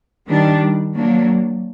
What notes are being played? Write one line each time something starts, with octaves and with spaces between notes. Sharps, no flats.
D#3 G3 D4
F#3 A#3 D4